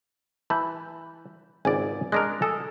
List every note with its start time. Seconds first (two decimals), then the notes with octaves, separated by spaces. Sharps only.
0.50 E3 A5 B5 G6
1.65 G#1 C#2 D5 G#5
2.12 G#3 D4 A#4 F#6 A#6
2.42 A4 G#5 D#6